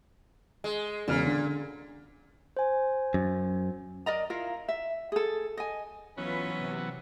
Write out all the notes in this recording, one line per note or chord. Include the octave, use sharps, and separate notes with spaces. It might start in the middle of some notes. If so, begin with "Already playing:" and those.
G#3
E1 A#2 C#3 F6
D3
C5 G#5
F#2
A#4 D5 D#5 A#5
E4 F4 A#4 F5
E5
G#4 A4
D#5 G#5
E3 F#3 B3 C#4 F4 B4
C3